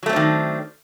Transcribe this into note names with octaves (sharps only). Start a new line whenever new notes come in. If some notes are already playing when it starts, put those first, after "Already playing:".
D#3 F#3 A3 C4 D4